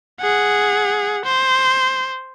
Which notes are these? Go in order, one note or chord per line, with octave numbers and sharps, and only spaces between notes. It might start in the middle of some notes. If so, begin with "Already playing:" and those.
G#4 F#5
C5